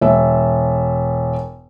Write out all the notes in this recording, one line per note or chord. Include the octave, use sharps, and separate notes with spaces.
E1 E5